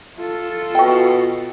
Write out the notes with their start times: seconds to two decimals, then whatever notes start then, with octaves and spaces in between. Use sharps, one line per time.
0.17 F4 A4
0.75 B2 F#4 G5